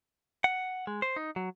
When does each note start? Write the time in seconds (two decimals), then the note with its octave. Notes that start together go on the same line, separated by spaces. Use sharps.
0.44 F#5
0.87 G#3
1.02 C5
1.16 D#4
1.36 F#3